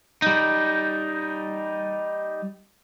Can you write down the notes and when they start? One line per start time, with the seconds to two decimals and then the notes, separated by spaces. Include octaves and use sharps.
0.22 G3 D#4